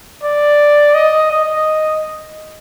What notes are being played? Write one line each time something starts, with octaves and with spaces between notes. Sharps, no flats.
D5
D#5
D#5